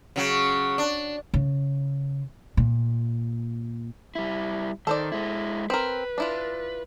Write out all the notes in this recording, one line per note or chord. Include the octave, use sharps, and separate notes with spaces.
C#3 F#3
D4
C#3
A#2
G3 E4
D#3 A4 C5 D5
G#3 E4
C4 A#4 B4
D4 E4 F4